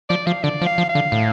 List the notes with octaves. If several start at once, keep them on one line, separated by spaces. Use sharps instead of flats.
F3 D5
F3 F5
D3 D5
F3
F5
F3
F5
D3
A2